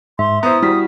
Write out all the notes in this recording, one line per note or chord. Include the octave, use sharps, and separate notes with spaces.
G#2 E5 C6
B3 E4 C5 A#5 D#6
G3 E4 F#4 B6